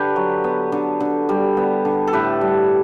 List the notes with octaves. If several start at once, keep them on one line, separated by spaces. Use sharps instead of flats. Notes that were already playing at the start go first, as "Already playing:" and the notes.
Already playing: D3 G4 B4
F#3
B3
D3
D3
G3
B3
D3
A4
A2 G4 B4
G3